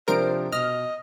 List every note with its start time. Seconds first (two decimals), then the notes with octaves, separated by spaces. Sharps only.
0.08 C3 F3 D4 A#4 C5 D7
0.53 B2 D#5 F6